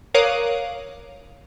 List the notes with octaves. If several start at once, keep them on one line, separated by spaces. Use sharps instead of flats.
A#4 C#5 F5 D6 D#6 F#6